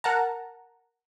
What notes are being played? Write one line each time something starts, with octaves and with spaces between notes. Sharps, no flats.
A#4 F#5 A5 A#5